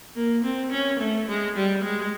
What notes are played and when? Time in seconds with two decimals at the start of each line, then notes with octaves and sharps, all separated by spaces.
0.15 A#3
0.44 C4
0.71 C#4
1.00 A3
1.28 G#3
1.56 G3
1.84 G#3